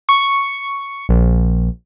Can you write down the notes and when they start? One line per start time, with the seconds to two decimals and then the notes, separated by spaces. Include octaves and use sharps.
0.09 C#6
1.09 A#1